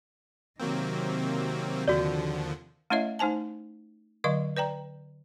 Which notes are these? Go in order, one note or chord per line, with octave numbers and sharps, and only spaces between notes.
C3 D#3 F#3 A#3 C4
D#2 D3 F3 F#4 D5
A3 C#4 E4 C#5 D#5 E5
A3 D#4 C5 G#5 A5
D3 F#3 D#5 F5 C#6
B4 D5 G5 A#5